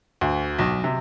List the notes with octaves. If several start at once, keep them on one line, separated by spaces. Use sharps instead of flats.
D2
B1
C3